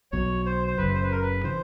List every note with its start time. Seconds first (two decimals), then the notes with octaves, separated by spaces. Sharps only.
0.12 B1 B2 F#3 C#5
0.46 C5
0.67 C5
0.78 F#1 F#2 C#3 B4
0.94 C5
1.03 B4
1.12 A#4
1.22 B4
1.44 C#3 E3 C5